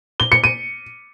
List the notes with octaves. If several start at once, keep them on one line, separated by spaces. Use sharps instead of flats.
G7
C#7
D#7